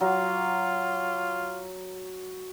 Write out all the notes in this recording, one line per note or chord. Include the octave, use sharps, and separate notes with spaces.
F#3 F4